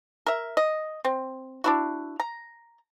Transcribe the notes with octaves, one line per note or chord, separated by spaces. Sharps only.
A#4 E5
D#5
C4
D4 E4 F#4
A#5